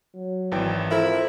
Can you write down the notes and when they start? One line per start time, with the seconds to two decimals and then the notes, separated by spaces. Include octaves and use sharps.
0.16 F#3
0.52 G#1 E3 G5
0.91 F2 E4 A#4 C5